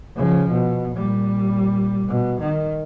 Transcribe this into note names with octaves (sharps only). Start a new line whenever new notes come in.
C#3 F3
B2
A#2 G3
B2
D#3